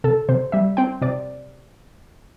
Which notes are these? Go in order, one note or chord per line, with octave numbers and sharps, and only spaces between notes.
C3 A4
C3 C5
G3 E5
C4 G5
C3 D5